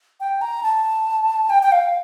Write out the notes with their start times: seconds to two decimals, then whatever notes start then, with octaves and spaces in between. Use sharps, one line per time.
0.20 G5
0.41 A#5
0.63 A5
1.49 G5
1.63 G5
1.72 F5